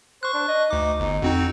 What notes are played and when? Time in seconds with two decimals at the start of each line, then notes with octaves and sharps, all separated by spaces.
0.23 C5 C#6 F#6
0.34 D4
0.48 D#5
0.71 D2 D#4 D6
1.00 G1 D#4
1.22 F2 C4 D#4 F#4